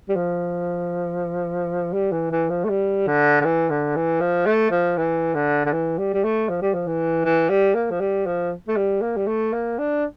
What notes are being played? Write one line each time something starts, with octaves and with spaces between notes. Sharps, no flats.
G3
F3
G3
E3
E3
F3
A3
G3
D3
D3
E3
D3
E3
F3
A3
F3
E3
D3
D3
E3
G3
G3
A3
F3
G3
F3
E3
E3
G3
A#3
F3
G3
F3
A3
G3
A#3
G3
A3
A#3
D4